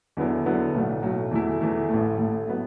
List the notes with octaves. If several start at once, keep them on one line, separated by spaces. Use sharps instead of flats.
E2 D3 F#3 B3 E4
E2 D3 F#3 B3 E4
B1 A2 F#3 A3
B1 A2 F#3 A3
E2 E3 A3 E4
E2 E3 A3 E4
A1 A2 A3
A1 A2 A3
F#3 B3